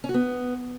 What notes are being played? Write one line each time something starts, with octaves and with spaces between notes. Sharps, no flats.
C#4
F#4
B3